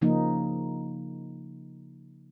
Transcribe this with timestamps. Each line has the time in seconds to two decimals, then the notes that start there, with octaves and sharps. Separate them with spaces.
0.02 C#3 F3 A#3 D#4